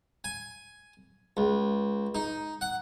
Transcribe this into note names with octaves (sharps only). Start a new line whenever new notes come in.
G#5
C#2
D#4
F#5